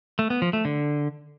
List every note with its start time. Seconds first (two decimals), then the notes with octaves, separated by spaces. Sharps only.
0.19 A3
0.30 B3
0.42 F3
0.53 A3
0.65 D3